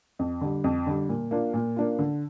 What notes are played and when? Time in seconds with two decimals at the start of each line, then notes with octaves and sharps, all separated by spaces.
0.19 F2
0.41 D3 G3
0.64 F2
0.86 D3 G3
1.09 A#2
1.31 A#3 D4 F4
1.54 A#2
1.76 A#3 D4 F4
1.99 D3